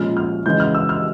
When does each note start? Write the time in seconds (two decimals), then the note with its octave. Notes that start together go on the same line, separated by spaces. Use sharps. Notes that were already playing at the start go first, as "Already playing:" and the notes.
Already playing: A#2 F3 G#3 C#4 F6
0.17 F6
0.45 C#3 E3 G#3 G6
0.60 F6
0.75 E6
0.89 F6